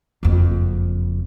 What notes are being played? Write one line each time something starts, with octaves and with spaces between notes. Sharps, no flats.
F#1 F2